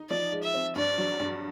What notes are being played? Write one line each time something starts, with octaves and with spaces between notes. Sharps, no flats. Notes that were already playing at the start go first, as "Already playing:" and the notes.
Already playing: D#4
F3 D5
G#3
E5
C4
G2 D5
F#3
G2